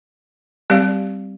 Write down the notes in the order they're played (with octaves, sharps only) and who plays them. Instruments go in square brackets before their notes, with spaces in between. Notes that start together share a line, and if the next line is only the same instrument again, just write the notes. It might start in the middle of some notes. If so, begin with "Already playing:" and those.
[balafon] G3 C4 G4 D5 F5